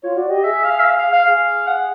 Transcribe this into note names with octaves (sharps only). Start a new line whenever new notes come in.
F4 C#5
F#4 D5
G4 D#5
G#4 E5
F5
E5
F5
F5
F5
G#4 F5
F#5